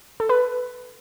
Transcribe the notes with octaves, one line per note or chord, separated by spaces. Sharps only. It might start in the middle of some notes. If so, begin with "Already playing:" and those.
A4
B4